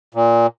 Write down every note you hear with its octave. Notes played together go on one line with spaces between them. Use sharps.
A#2